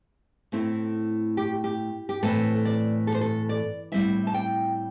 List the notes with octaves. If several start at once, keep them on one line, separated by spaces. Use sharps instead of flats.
A2 A3 C4 E4
G4
G4
G4
A2 E3 A3 C4 A4
D5
A4
C5
A4
D5
A2 G3 C4 E4 E5
A5
G5